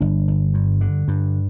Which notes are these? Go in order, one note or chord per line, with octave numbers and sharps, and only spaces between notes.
G1 D4
G1
G2
D3
G2